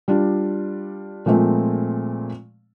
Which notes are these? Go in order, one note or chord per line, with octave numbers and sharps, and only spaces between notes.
G3 D4 F4
A#2 F3 G#3 A3 C4